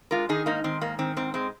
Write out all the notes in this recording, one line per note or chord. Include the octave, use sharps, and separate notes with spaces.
G#3 F4 A#4
D#3 D#4 G#4
G#2 A#3 D#4
D#3 C4
G#2 A#3
D#3 C4
G#2 C4
G#3 C4